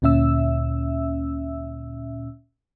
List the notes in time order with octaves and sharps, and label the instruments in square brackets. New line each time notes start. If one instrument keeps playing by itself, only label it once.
[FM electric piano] D2 A#2 C#4 E5 E6